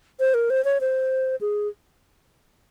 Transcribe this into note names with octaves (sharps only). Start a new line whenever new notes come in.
C5
A#4
C5
C#5
C5
G#4